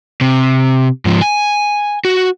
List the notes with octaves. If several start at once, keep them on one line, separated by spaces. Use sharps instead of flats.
C3
G#2 F3
G#5
F#4